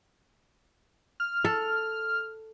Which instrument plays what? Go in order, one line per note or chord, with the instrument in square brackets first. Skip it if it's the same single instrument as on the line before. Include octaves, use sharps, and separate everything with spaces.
[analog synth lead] F6
[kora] A4